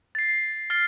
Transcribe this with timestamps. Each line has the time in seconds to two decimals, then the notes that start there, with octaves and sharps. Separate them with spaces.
0.15 A6 C7
0.70 F6 A6 C7